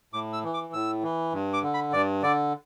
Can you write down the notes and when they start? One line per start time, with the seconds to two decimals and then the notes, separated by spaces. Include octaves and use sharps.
0.13 A2 D6
0.33 E6
0.44 E3
0.54 D6
0.73 A2 E6
1.03 E3
1.33 G2
1.53 D6
1.63 D3
1.74 B5
1.93 G2 D5
2.23 D3 D5